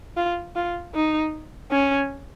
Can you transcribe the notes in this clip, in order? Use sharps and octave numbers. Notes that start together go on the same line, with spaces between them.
F4
F4
D#4
C#4